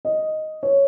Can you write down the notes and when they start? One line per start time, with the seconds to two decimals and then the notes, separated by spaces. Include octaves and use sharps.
0.05 D#5
0.63 C#5